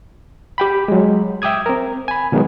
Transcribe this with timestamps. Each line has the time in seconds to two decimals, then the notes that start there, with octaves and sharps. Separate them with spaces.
0.58 G4 G5 B5
0.88 F#3 G#3
1.42 E5 G5 D6 D#6 G#6
1.66 C4 A#4
2.08 G#5 B5
2.32 B2 D#3 F#3 G#3 B3